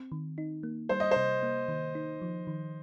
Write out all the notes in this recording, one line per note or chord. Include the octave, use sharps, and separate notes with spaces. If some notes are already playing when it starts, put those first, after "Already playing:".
Already playing: C4
D#3
D#4
A#3
G3 C5
D#5
C5
C3
A#3
D#3
D#4
F3
D#3